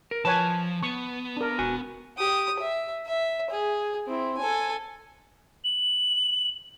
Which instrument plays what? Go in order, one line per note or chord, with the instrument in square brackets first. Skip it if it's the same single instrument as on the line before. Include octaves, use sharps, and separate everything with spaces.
[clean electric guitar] A#4
[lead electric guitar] F3 [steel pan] B4 C#5 G#5 [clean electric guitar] A5
[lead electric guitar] B3 [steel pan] C#6
[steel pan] D4 A#4
[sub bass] E1 [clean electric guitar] F#4 G#5
[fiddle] G4 D#6
E5
E5
G#4
C4 E4
A4 G#5
[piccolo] F#7